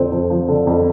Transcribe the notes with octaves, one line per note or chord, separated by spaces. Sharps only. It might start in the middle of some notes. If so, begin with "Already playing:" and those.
Already playing: F2 D3 F3 C4
F2
F3
D3
F2